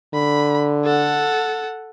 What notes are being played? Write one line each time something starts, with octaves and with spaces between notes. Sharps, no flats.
D3 B5
A4 F#5